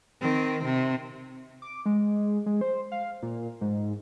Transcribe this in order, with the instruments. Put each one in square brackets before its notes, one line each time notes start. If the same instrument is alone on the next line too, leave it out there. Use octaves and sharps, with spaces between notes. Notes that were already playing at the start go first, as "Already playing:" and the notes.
[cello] D#3 C4
C3
[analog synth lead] D6
G#3
G#3
C5
F5
A#2
G#2